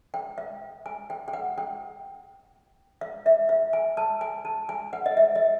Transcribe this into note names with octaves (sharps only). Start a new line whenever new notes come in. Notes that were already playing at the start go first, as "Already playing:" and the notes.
G5
F5
G#5
G5
G5
F#5
G5
F5
E5
F5
G#5
A5
G#5
A5
G#5
F#5
D#5
E5
D#5